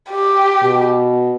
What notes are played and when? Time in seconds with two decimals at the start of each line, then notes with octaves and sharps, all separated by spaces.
0.11 G4
0.63 B2